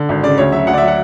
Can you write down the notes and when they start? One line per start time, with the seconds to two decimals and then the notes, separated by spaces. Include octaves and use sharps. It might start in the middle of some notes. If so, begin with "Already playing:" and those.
Already playing: D3
0.09 G#1
0.23 C#3 D5
0.38 D2 C#5
0.52 F#3 E5
0.67 D2 F#5
0.73 D5
0.78 E5
0.82 F#3
0.87 F#5